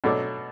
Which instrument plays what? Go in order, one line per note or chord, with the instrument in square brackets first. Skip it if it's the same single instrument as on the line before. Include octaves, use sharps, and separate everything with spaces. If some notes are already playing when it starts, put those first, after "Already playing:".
[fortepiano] B2 F#3 A3 D4